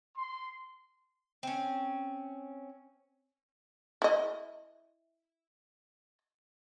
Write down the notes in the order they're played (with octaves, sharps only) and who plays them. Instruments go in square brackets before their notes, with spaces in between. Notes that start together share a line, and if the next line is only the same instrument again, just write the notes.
[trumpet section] C6
[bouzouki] C4 C#4
[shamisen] E4 D#5